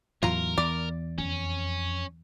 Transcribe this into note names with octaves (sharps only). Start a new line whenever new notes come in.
E2 A2 F#3 F4 A#4 A#5
E2 D5
F2 C#4